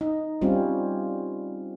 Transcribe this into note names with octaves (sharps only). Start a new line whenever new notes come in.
D#4
G3 C4 C#4 F4